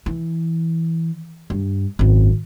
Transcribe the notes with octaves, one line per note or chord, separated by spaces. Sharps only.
E3
G2
G#1 F#2